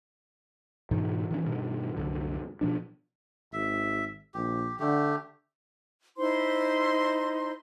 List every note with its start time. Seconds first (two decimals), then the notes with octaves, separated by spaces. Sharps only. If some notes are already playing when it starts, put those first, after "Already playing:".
0.91 G#2 B2 D#3 E3
1.31 D#3 E3 C#4
1.46 G2 B2 D#3
1.97 C2 F#2 D3
2.61 B2 F3 D4
3.53 G#1 E5
4.34 A#1 G4
4.80 D3 A3 G4
6.17 D#4 E4 C5 C6